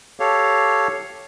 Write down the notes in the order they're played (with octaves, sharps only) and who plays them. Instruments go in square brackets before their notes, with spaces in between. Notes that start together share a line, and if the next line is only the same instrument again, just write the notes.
[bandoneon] G4 A4 C#5 F5